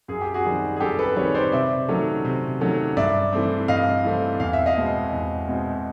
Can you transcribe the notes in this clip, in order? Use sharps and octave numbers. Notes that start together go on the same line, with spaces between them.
F#2 G#4
G4
F#4 G#4
D#3 G3 C4
G#4
F#2 G4 A4
A4 B4
D#3 G3 C4 B4 C#5
C#5
C5 D5
C3 D5 E5
D#3 F#3 A3 C#4
C3
D#3 F#3 A3 C#4
G2 D5 E5
E3 A3 C4
G2 D#5 F5
E3 A3 C4
E2 F5
E5
D#5 F5
B2 G#3 C4
E2
B2 G#3 C4